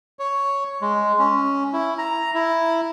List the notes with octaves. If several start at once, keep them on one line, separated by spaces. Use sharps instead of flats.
C#5
G#3
C#4
E4
A#5
E4